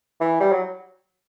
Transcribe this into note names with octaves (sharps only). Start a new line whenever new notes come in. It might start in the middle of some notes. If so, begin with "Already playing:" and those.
E3
G3
F#3